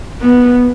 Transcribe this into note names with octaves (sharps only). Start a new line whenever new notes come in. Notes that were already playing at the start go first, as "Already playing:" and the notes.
B3